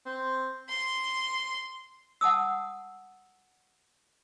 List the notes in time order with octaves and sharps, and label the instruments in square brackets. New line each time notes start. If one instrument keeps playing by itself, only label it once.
[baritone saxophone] C4
[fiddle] C6
[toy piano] F#5 A5 D#6 E6